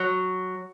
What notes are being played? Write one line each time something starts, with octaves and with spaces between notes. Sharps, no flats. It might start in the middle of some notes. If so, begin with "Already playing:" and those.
Already playing: F#3